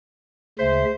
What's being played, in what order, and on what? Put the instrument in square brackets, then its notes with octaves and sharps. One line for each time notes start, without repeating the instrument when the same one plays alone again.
[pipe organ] D2 C#3 E5 [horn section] G#3 C5